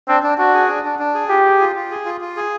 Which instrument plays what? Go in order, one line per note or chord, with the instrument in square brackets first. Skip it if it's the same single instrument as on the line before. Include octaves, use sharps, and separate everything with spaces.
[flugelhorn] C4 [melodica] D4
[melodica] D4
[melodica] D4 [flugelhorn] F#4
[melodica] G#4
D4
D4
D4
G#4
[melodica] F4 [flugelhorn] G4
[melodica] G#4
F4
F4
G#4
F4
F4
G#4